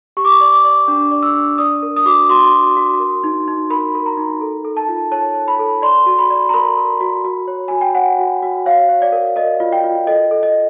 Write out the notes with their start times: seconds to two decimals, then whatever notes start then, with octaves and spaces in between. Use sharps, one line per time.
0.17 G4 C#6
0.25 D6
0.32 C#6
0.41 D5
0.53 D6
0.64 D5
0.88 D4
1.11 D5
1.22 E6
1.34 D4
1.58 D5 D#6
1.83 A#4
1.97 D#6
2.05 F#4 D6
2.29 F#4 C6
2.52 F#4
2.76 F#4
3.00 A#4
3.24 D#4
3.48 D#4
3.70 A#4 B5
3.95 A#4
4.06 A#5
4.17 D#4
4.41 A4
4.65 A4
4.77 A5
4.89 F4
5.12 C#5 A5
5.35 C#5
5.48 B5
5.59 A4
5.82 D5 C6
6.06 F#4
6.19 B5
6.30 D5
6.49 A#5
6.54 A#4 B5
6.77 A#4
7.00 F#4
7.24 F#4
7.48 C#5
7.68 F#4 G#5
7.81 G5
7.95 C#5 F#5
8.18 F#4
8.43 F#4
8.66 C#5 F5
8.89 C#5
9.02 D5
9.12 A#4
9.36 A#4 D#5
9.60 F4
9.72 G5
9.84 F4
10.07 A4 D#5
10.31 A4
10.43 D#5